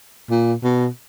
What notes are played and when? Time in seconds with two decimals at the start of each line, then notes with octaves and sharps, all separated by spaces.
0.30 A#2
0.63 B2